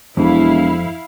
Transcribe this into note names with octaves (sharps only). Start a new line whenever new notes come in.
E1 F2 E4 F5